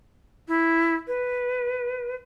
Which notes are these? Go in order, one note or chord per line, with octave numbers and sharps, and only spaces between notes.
E4
B4